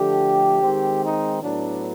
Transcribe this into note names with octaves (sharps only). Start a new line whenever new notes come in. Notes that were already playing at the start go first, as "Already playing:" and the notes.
Already playing: D3 F3 A3 G4
D#3 G#3 C4
D#4
A2 F#3 B3 D4